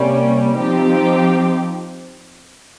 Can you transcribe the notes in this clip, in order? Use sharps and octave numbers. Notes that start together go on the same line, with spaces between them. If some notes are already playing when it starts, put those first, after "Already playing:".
Already playing: C3 G3 A#3 C#4
F3 C4 D#4 G4